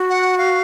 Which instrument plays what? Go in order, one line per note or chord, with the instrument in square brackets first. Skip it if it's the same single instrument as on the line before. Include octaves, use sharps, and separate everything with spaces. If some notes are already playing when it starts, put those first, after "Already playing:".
Already playing: [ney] F#4
[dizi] F#5
F5